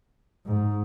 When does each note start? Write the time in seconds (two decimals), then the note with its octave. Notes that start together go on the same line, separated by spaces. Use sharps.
0.46 G#2